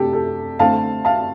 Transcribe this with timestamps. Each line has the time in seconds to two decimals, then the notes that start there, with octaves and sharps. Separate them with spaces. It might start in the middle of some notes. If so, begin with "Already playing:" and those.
Already playing: C3 A3 D4 G4 A4
0.13 A4
0.59 D3 A3 C4 F5 A5
1.05 F5 A5